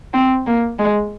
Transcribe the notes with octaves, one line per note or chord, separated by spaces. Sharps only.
C4
A#3
G#3